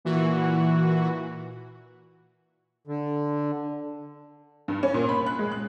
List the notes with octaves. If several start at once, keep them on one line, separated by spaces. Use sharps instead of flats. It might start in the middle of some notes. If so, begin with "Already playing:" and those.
A#2 E3 F#4
D3
G2
C#4
A#2
B5
F#6
G#3
F#6